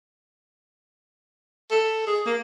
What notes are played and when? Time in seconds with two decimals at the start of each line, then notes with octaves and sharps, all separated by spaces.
1.71 A4
2.07 G#4
2.26 A#3